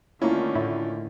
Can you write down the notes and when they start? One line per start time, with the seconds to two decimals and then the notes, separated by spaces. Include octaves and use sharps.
0.22 D3 D#3 A3 A#3 C#4 E4 F4
0.55 A2 E4